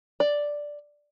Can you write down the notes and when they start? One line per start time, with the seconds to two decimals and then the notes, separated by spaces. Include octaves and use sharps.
0.20 D5